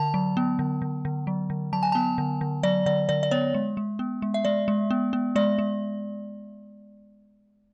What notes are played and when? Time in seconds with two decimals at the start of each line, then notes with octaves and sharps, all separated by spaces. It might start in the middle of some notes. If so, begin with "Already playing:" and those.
Already playing: D3 A5
0.14 F#3
0.37 B3
0.59 D3
0.82 D3
1.05 D3
1.27 F#3
1.50 D3
1.73 F#3 A5
1.83 G#5
1.92 B3 A5
2.18 D3
2.41 D3
2.63 F#3 D5
2.86 D3 D5
3.09 D3 D5
3.23 D5
3.31 B3 C#5
3.54 G#3
3.77 G#3
3.99 B3
4.22 G#3
4.34 E5
4.45 G#3 D5
4.68 G#3
4.91 B3
5.13 B3
5.36 G#3 D5
5.59 G#3